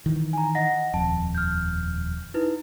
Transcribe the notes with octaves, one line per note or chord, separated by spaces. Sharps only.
D#3 E3
G#5 A#5
D#5 F#5 A#6
D#1 F2 A5
F6 G6
D#4 E4 B4